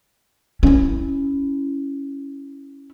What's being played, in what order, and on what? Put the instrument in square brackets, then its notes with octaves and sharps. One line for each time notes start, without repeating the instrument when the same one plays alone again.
[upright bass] C#4 E4